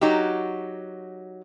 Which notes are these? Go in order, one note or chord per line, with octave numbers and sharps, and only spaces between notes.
F#3 D#4 F#4 G4